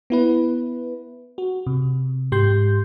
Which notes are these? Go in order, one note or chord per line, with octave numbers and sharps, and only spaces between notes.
B3 E4 B4
F#4
C3
G#2 G4 C6 G6